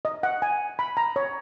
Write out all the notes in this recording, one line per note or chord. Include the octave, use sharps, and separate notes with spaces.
D#5
F#5
G#5
B5
A#5
C#5